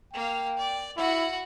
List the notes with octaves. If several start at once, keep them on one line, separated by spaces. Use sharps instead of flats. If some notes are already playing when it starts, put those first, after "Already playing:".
A#3 F5 G5
D5
E4 F#4 F#5